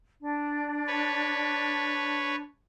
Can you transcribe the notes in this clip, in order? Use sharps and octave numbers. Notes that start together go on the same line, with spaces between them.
D4
B4 C#5